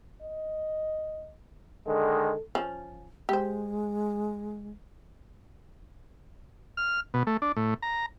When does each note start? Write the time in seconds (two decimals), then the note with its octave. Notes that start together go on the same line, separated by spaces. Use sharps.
0.22 D#5
1.87 D3 D#3 G#3 A4
2.55 F3 C#4
3.29 G#3 G4 C5
6.77 F6
7.14 B2
7.27 A3
7.42 D4
7.57 A2
7.82 A#5